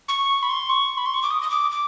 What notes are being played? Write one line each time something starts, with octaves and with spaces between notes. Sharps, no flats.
C#6
B5
C6
C#6
B5
C6
C#6
D6
D#6
D#6
D6
D6